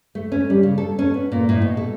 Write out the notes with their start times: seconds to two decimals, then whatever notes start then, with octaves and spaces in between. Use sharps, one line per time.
0.15 A3
0.32 C#4
0.50 G3
0.63 C#3
0.78 A4
0.99 C#4
1.14 B3
1.32 A#2
1.49 A2
1.62 B2
1.77 A4